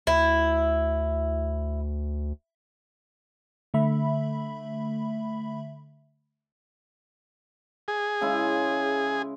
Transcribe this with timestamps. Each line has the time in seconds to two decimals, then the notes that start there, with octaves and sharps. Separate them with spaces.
0.07 D2 E4
3.74 D3 A3 E5 B5
7.88 G#4
8.21 C#3 G#3 E4